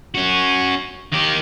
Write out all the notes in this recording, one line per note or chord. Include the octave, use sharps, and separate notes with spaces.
C#4 F#4
D#3 G4